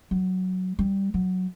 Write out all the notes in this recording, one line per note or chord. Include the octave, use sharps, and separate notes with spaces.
F#3
G3
F#3